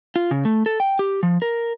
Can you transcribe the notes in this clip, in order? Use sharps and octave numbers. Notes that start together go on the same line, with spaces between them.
F4
C#3
A3
A4
G5
G4
F3
A#4